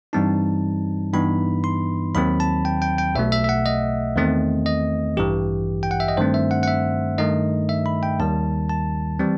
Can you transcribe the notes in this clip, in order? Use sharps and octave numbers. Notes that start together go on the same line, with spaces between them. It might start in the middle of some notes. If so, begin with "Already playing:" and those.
G2 E3 G3 C4 D#4 A5
G2 E3 B3 D#4 B5
C6
D#2 D#3 F#3 C4 B5
A5
G5
G5
G5
B1 B2 A3 E5
E5
E5
F#5
D#5
E2 D#3 A3 C4
D#5
A1 G2 E3 G4
G5
F#5
E5
D#5
G2 D#3 A3 C4 C5
E5
F#5
F#5
E5
G2 D#3 A3 D#4 D#5
E5
B5
G5
D#2 D#3 G3 A5
A5
E3 G3 C4